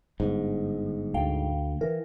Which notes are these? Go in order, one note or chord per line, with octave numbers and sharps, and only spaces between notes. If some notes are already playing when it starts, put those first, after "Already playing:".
G1 G#2
D2 F5 G5
E3 A#4